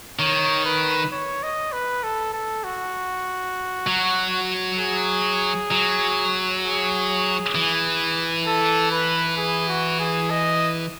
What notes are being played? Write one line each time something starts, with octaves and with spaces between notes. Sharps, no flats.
D#3 C#5
B4
C#5
D#5
B4
A4
A4
F#4
F#3
G#4
F#3
G#4
E3
A4
B4
G#4
F#4
G#4
D#5